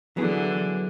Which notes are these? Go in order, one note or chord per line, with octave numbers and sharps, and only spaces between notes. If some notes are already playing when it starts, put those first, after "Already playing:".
D3 E3 F#3 B3 E4 G#4